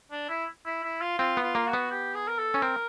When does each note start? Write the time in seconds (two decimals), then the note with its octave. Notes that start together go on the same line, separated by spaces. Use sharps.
0.12 D4
0.29 E4
0.66 E4
0.84 E4
1.02 F4
1.19 C4 F4
1.37 B3
1.43 F4
1.55 A#3
1.67 F#4
1.73 B3
1.91 G4
2.15 G#4
2.28 A#4
2.39 A4
2.54 C#4
2.62 C4 A#4